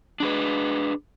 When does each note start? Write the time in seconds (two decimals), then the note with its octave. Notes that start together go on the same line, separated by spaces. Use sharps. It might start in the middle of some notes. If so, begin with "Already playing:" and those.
0.20 D4 G#4 B4